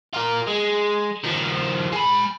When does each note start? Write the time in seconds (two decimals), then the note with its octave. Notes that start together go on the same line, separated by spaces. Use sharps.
0.14 F4 A#4
0.48 G#3
1.24 D#3 F3
1.93 G#3 B5